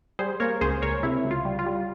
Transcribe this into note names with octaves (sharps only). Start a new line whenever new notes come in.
G3 G#4 C5
A#3 A#4 C#5
C#2 G#4 C5
C#2 A#4 C#5
C3 E4
C#2
F4
G3
F4
G3